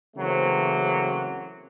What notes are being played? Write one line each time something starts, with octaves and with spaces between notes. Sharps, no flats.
C#3 E3 F#3 A3 A#3 C4